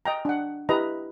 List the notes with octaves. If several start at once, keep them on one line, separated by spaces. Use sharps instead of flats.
D#5 G5 A#5
D4 F#5
E4 G4 B4 D#5 A#5